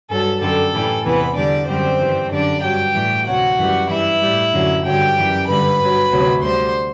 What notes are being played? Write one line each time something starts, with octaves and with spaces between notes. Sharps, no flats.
G2 F#3 A4
F#2 D3 G3 A4
A2 E3 G3
E2 C3 E3 B3 B4
E2 D3 G3 D4 D5
F#2 D3 G3 C4 C5
G2 E3 G3
F#2 D3 G3 D4 D5
G2 F#3 G4 G5
A2 E3 G3
D2 C3 F#3 F#4 F#5
F#2 E3 G3
G2 E3 G3 E4 E5
A2 G3
F#2 D3 F#3
G2 D3 F#3 G4 G5
F#2 E3 G3
G2 D3 G3 B4 B5
G2
F#3
D2 C3 F#3
D2 D3 G3 C5 C6